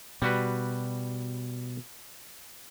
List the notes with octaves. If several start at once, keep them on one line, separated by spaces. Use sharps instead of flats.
B2 G3 F#4 B4